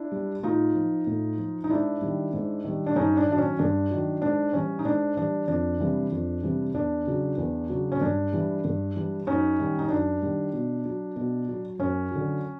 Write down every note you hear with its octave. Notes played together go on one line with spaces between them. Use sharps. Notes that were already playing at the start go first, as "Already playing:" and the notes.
Already playing: D4 E4
G3
A2 D#4 F4
F3
A2
F3
D#4
G#2 D4 E4
D#3 G3
G#2
D#3 G3
D4
G2 C#4 D#4
D4
D#3 F#3 D4
C#4
G2 D4
D#3 F#3
G#2 D4
E3 G3 C#4
D#4
G#2 D4
E3 G3 D4
F2 D4
C3 E3 G3
F2
C3 E3 G3
E2 D4
C#3 F#3
E2
C#3 F#3
C#4
G2 D4
E3 G3
G2
E3 G3
F#2 C#4 D#4
D#3 G3
D#4
F#2 D4
D#3 G3
B2
F#3
B2
F#3
F#2 C#4
D3 F#3